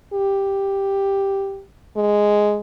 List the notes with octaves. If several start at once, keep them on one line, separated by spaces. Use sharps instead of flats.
G4
G#3